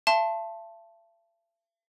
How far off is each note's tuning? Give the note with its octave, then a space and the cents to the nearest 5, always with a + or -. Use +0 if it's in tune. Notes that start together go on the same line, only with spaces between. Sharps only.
E5 +45 A5 +0 C6 +25